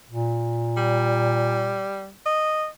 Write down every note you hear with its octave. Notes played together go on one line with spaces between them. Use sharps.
A#2
G3
D#5